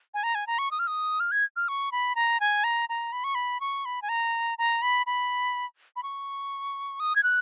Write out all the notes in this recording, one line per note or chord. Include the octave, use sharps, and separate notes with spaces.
G#5
A#5
G#5
A#5
C#6
D#6
F6
D#6
F6
G#6
F6
C#6
B5
A#5
G#5
A#5
A#5
B5
C#6
B5
C#6
B5
G#5
A#5
A#5
B5
B5
B5
C#6
D#6
G#6
F#6